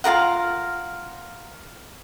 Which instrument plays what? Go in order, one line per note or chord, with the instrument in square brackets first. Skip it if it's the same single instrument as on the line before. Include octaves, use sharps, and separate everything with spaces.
[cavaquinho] F4 G#4 A#4 F#5